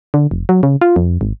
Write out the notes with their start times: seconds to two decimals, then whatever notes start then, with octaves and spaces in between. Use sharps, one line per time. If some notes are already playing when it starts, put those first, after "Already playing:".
0.14 D3
0.31 F1
0.49 F#3
0.63 C#3
0.81 F4
0.96 F2
1.21 G#1